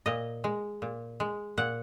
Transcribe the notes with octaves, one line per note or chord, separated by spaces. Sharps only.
A#2 D#5
G#3
A#2
G#3
A#2 F#5